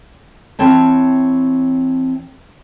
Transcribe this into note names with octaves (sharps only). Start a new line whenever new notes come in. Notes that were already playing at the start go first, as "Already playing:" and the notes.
E3 C4 C#5 A5